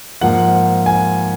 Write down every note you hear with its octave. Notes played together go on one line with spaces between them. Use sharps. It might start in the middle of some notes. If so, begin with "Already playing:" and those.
G#2 F3 A#3 F#5
G#5